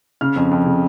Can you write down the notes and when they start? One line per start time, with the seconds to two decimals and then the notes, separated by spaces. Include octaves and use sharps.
0.21 C#3 F6
0.36 F2
0.51 F2
0.66 C#3